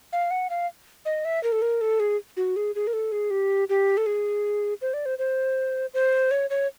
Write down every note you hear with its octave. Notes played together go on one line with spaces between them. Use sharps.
F5
F#5
F5
D#5
E5
A#4
A4
A#4
A4
G#4
F#4
G#4
G#4
A#4
A4
G#4
G4
G4
A4
G#4
C5
D5
C5
C5
C5
C#5
C#5